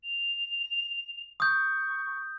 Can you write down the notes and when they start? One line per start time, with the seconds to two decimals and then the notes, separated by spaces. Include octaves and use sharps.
0.03 F7
1.40 C#6 D#6 G6